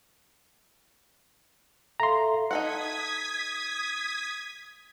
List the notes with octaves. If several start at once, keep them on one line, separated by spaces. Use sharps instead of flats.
A4 E5 F5 A#5 C6
D#4 A4 F#5 D#6 G#6 B6